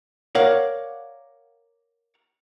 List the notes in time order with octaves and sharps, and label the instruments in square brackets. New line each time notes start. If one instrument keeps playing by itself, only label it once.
[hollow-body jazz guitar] A#4 C#5 D5 F5 F#5